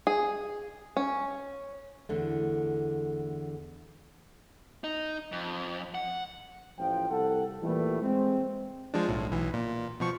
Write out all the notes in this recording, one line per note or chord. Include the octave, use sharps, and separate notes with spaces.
G#4
C#4
E2 D3 A3
D#4
F2
F#5
A1 F3 G5
C2 A4 F#5
A#2 E3 G3 A3 E4
G#3 C4
F3 G#3 D4
B1 A2
B1 E3
A#2
B2 F3 C#6